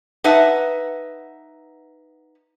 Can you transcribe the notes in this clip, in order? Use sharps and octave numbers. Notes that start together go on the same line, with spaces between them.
D#4 B4 E5 F#5 A5